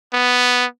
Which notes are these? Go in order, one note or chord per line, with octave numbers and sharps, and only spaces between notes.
B3